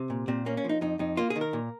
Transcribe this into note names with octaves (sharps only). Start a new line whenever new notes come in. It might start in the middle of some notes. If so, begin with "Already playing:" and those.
Already playing: C3
A#2
A#2 C4
A#3 C#4
C#4
F3 D#4
F2 D#4
F2 D#4
A#3 F4
G#4
D#3
A#4
A#2